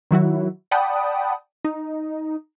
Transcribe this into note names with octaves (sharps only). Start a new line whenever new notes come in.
D#3 F#3 E4 F#4
D5 F#5 G5 A5 B5 D#6
D#4